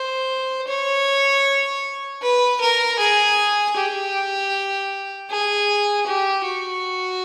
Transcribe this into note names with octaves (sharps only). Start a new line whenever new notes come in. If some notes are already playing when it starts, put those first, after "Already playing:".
Already playing: C5
C#5
B4
A#4
G#4
G4
G#4
G4
F#4